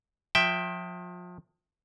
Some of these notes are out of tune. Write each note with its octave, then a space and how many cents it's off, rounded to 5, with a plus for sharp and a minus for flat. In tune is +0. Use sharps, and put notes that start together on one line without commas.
F3 +35 E5 +0 G5 +0